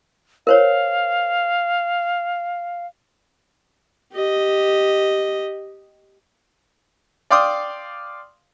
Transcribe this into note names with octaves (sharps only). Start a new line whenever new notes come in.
A#4 C5 C#5 F5
G4 D#5
D5 F5 G5 C6 D6 D#6